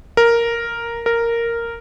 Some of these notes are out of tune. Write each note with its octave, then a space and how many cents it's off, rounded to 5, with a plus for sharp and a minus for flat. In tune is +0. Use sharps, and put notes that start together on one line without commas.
A#4 +0
A#4 -5